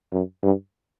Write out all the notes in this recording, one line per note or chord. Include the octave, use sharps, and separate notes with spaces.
F#2
G2